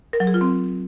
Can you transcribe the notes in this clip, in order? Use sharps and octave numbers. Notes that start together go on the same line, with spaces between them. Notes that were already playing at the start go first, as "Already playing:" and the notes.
A#4
F#3
G#4
F4
C4